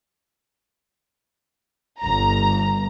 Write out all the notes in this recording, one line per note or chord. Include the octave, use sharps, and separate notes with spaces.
G1 A#5